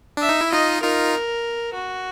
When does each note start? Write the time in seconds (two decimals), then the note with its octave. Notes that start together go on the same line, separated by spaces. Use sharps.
0.17 D4 E5
0.29 D#4
0.41 E4
0.52 D#4 F4 D#5
0.82 D#4 F4 A#4
1.74 F#4